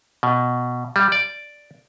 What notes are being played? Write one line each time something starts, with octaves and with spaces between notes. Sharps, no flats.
B2
G3
D5